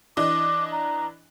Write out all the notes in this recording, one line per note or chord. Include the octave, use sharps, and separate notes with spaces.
E3 D4 D#5 D6
A#5